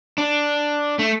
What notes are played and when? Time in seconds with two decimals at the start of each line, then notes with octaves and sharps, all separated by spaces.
0.18 D4
0.99 A3